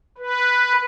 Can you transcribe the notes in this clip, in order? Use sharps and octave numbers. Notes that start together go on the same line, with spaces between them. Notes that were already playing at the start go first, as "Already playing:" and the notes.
B4